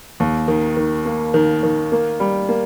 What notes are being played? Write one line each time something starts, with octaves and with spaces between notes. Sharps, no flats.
D#2
D#3
D#3
A#3
D#3
D#3
A#3
G3
A#3